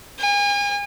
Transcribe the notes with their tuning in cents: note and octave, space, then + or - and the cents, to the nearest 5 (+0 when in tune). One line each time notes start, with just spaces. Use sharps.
G#5 -35